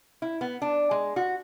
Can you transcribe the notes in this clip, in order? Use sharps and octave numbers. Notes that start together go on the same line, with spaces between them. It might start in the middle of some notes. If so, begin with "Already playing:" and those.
E4
B3
D4
G#3
F#4